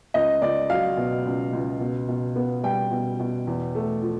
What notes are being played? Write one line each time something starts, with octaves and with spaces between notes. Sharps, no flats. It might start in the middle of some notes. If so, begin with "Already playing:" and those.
C#2 D#5
C#2 D5
F#3 F5
B2
C#2
C#2
B2
B2
B3
G3 G5
B2
B2
E2
A3
F3